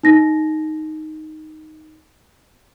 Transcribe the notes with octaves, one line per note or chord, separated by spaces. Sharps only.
D#4 A#6